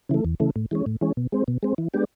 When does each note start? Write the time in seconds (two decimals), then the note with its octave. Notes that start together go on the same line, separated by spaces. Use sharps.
0.09 C#3 E3 A3
0.25 E2
0.40 C#3 E3 A3
0.56 A2
0.71 E3 G#3 C#4
0.86 A2
1.01 E3 G#3 C#4
1.17 B2
1.32 G#3 C4
1.48 B2
1.63 G#3 C4
1.78 E3
1.94 G#3 B3 D4 G4